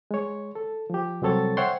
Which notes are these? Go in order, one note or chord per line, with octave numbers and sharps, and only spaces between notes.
G#3 C#5
A4
F3 G4
C2 F#3 C4 A4 C#5 A6
C5 C#5 E5 F#5 G5 C6